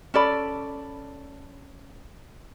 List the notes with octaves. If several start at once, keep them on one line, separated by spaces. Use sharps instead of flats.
C#4 A4 D5 B5